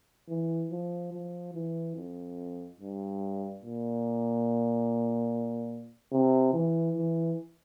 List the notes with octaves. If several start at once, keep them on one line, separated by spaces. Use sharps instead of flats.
E3
F3
F3
E3
F2
G2
A#2
C3
E3
E3